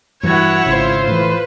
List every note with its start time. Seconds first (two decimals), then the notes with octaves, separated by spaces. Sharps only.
0.23 G2 E3 E4 F#4 C#5 F#5
0.66 G#1 C#3 F4 C5
1.07 A2 E3 B4